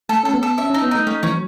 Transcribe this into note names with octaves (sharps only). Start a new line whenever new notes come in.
A3 A4
C#4 A4
B3
A4
C#4 E5
C#4 D#4
B3
A3 D#4
A3 C#4
E3 C#4
F#3